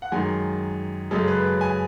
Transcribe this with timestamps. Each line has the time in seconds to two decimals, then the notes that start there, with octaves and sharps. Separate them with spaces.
0.02 F#5
0.12 F#2 D#3 G#3 G#5
1.11 F#2 C#3 G#3 A4
1.28 B4
1.61 G#5